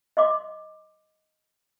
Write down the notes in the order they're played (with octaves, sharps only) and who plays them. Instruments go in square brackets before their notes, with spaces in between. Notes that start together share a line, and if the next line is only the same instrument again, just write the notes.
[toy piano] D#5 C6 D6